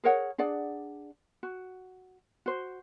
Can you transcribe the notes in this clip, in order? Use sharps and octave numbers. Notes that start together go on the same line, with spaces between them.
G#4 A#4 C#5 F#5
D4 G#4 D5 F#5
F#4
F#4 C5